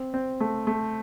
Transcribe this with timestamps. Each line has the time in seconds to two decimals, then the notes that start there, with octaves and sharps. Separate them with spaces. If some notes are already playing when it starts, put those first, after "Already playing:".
Already playing: C4
0.14 C4
0.40 A3
0.67 A3